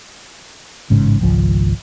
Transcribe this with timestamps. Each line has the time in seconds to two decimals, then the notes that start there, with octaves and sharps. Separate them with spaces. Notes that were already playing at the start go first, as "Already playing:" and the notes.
0.90 A1 G#2 C#3
1.21 G#1 C#2 F3